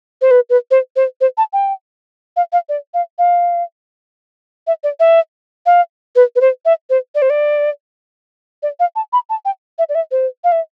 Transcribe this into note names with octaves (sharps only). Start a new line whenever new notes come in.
C5
B4
B4
C5
C5
C5
A5
G5
F5
F5
D5
F5
F5
E5
D5
E5
F5
B4
B4
C5
E5
C5
D5
C5
D5
D5
F5
A5
B5
A5
G5
E5
D5
E5
C5
F5
E5